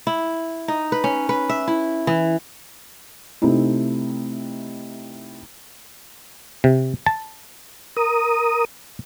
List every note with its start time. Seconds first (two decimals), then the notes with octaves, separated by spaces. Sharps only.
0.07 E4
0.68 D#4
0.92 B4
1.04 C#4
1.29 B4
1.49 E5
1.68 E4
2.07 E3
3.42 C3 A3 C4 D#4 E4
6.64 C3
7.06 A5
7.96 A#4 D#6